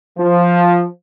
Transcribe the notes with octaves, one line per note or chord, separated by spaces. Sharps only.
F3